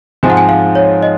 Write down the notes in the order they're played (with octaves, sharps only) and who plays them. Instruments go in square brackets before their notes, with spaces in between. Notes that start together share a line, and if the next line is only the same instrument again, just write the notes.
[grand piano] G#2 F3 G#3 C4 F4 [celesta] G#5
[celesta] F#5
G#5
F5
C#5
D#5